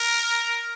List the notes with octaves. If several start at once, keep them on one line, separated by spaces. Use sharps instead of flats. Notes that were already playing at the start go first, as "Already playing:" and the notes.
Already playing: A#4